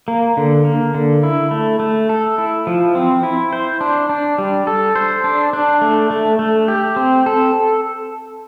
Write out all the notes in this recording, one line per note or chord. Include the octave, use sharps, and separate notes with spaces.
A#3
D3
A#3
D3
E4
A3
A3
A4
E4
F3
C4
E4
C5
D4
D4
G3
A4
C5
D4
D4
A3
A3
A3
G4
C4
A4